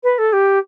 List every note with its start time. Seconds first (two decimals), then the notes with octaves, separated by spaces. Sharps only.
0.03 B4
0.18 A4
0.33 G4